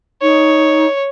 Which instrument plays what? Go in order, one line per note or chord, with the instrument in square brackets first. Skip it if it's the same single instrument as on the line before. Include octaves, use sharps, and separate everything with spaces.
[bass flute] D#4 [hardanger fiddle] C#5